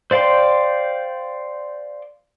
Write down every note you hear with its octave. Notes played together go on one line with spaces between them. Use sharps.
C5 D5 F5 G5 C6